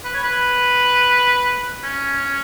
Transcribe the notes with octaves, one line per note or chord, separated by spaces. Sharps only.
B4
C#5
B4
C#4